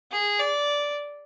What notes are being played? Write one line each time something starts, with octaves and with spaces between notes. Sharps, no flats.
G#4
D5